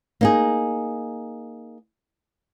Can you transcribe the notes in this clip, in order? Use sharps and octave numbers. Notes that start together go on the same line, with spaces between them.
A#3 D#4 G#4